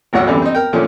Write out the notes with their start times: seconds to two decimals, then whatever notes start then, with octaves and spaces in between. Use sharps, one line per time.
0.13 G#1 D2 G#2 F#3 F#5 E6
0.27 F#2 D3 E3 G3 C4
0.42 C4 D#4
0.55 A#4 G5
0.73 A#2 D3 F3 A3 C#4